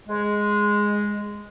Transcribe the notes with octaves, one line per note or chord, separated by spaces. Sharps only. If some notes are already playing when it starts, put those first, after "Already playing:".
G#3